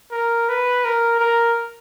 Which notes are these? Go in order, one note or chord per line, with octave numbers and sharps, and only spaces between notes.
A#4
B4
A#4
A#4